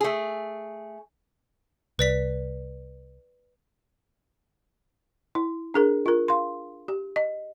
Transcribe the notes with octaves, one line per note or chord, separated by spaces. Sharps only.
A3 G#4
C2 B4 D5 B6
E4
D4 G#4 A#4
F4 A#4
F5 C6
G4
D#5